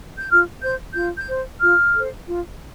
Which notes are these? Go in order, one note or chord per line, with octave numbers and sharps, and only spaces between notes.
G6
F4 F6
C5 G6
F4 G6
G6
C5
F4 F6
A4 C5
F4